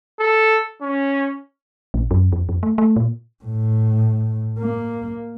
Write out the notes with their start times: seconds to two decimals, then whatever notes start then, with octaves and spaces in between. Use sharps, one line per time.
0.19 A4
0.82 C#4
1.94 A#1
2.11 F#2
2.32 F2
2.49 F2
2.63 A3
2.78 A3
2.96 A#2
3.44 A2
4.59 A#3